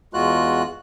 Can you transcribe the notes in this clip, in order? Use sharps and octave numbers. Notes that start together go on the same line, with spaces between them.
E2 G#3 F4 F#4 F#6